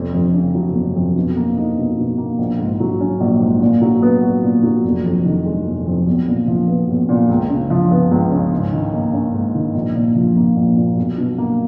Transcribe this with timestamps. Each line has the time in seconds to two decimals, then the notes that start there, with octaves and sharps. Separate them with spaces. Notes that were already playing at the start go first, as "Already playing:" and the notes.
Already playing: F1 F2
0.14 F2
0.34 C#3
0.55 F#3
0.75 F1
0.96 F2
1.16 B2
1.36 A#3
1.57 D#4
1.77 B2
1.98 B2
2.18 A#3
2.39 A#1
2.59 G#2
2.80 F#3
3.00 C#4
3.20 A#1
3.41 G#2
3.61 A#2
3.82 F#3
4.02 B3
4.22 F#4
4.43 A#2
4.63 F#3
4.84 F1
5.05 F2
5.25 D#3
5.46 G#3
5.66 F1
5.86 F2
6.07 B1
6.28 A#2
6.48 F3
6.68 B3
6.89 B1
7.09 A#2
7.30 C#2
7.50 C#3
7.70 F3
7.91 B3
8.11 C#2
8.32 C#3
8.52 G#2
8.72 D#3
8.93 A#3
9.13 C#4
9.34 G#2
9.54 D#3
9.75 A#1
9.95 A#2
10.16 F3
10.36 A#3
10.57 A#1
10.77 A#2
10.97 B1
11.18 B2
11.38 A#3